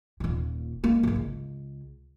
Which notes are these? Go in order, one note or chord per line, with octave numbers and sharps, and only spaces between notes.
D#1 A#2
G#3 A#3
G#1 E2
C#2